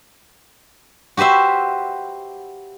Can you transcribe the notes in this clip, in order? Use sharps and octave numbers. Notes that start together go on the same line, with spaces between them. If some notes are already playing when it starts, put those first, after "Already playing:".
F#4 G4 B4 C5 E5